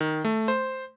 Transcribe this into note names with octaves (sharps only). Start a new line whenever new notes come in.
D#3
A3
C5